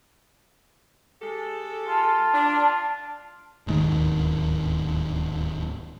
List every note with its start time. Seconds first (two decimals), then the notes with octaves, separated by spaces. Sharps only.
1.21 G#3 G4 A4
1.88 F4 A5
2.33 D4
3.67 D1 D#2 G#2 D#3